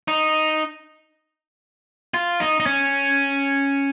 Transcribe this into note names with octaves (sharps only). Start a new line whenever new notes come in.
D#4
F4
D#4
D#4
C#4